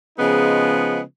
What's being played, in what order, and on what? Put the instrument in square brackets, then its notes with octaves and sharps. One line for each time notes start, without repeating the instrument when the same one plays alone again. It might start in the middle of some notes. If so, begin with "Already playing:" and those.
[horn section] C#3 F3 G#3 B3 D#4